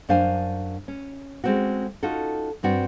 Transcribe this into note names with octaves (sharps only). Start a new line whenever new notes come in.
F#2 D4 C5 F5 G#5
C#4
G#3 A3 C4 C#4 F#4
C#4 D#4 F4 F#4 A4
G2 C4 F#4 D5